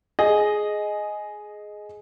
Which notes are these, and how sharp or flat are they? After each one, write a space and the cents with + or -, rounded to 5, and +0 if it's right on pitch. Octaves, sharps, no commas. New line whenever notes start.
G#4 +10 D#5 +0